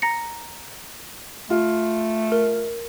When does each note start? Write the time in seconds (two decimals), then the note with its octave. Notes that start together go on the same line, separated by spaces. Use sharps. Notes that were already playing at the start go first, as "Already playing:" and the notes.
0.02 A#5 A#6 C#7
1.50 A3 F4
2.32 A#4